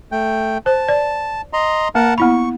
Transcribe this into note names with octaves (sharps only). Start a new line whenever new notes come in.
A3 G5
C5 A5
D5
D#5 A#5 C6
A#3 A#4 F#5 A5
B3 E4 B5 C#6